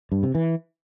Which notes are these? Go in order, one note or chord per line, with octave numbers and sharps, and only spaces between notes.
G2
C3
E3